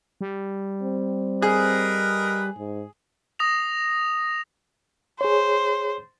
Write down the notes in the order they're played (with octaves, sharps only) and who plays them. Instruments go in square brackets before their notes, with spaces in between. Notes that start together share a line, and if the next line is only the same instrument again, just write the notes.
[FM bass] G3
[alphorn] C4
[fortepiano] G#4 [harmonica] A#4 B4 D#5
[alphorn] G#2
[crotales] D#6 A#6 F7
[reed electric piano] G#4 C#5 [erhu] C5